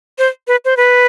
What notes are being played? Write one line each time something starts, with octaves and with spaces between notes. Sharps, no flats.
C5
B4
C5
B4